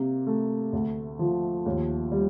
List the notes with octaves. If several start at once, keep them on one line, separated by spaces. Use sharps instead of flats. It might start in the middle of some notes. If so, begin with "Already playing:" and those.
Already playing: C3 A#3
A3
D2
F3
D#2
G3